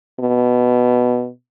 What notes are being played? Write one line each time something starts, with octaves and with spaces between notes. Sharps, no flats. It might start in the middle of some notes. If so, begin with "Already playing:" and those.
B2